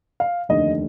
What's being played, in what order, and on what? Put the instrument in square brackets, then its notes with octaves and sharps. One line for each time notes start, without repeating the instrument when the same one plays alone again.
[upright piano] F5
F1 D#2 D3 D#5